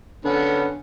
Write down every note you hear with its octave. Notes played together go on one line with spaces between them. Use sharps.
D3 B3 C#4